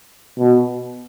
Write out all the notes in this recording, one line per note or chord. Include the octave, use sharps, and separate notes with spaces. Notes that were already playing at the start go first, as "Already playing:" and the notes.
B2